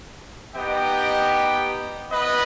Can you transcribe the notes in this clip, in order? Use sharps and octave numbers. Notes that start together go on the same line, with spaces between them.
B3 D#4 G4 D#5 G5
B3 E4 B4 D#5